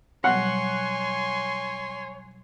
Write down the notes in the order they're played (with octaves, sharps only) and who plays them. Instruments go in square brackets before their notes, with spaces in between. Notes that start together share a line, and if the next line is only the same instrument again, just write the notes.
[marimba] B2 F#3 G3 [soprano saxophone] C#5 [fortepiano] F#5 [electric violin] G#5 C6